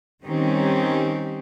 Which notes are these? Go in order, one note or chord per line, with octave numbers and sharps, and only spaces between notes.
D#3 G3 C4 C#4 D#4 G4